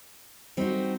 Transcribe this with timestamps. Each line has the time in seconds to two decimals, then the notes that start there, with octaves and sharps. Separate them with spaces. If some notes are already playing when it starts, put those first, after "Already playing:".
0.57 G3 C4 D#4 F#4